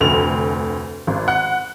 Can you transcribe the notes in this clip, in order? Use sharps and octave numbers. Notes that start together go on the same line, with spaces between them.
F1 D2 F7
G#1
F#5